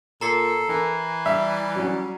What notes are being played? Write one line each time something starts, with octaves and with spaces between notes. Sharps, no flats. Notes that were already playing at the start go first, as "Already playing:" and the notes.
A#2 A4 A#5 C7
E3 A#4
G3 E5
F#3 C#4